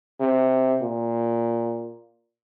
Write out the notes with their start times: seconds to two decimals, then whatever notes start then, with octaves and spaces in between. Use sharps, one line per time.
0.20 C3
0.82 A#2